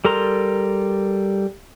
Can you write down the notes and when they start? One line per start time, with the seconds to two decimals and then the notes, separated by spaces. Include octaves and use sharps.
0.05 G3 A4 A#4 A#5 C6